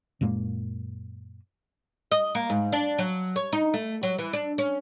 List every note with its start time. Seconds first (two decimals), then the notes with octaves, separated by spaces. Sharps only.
0.21 F#2 A#2 G#3 A#3
2.12 D#5
2.35 A#3
2.50 G#2
2.72 D4
2.98 F#3
3.36 C#5
3.53 D#4
3.74 A3
4.03 F#3
4.18 E3
4.33 D4
4.58 C#4